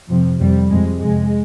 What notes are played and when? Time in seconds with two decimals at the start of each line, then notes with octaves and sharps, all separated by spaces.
0.09 F2 C3 F3
0.40 F2 C3 G3
0.70 F2 C3 G#3
1.01 F2 C3 G#3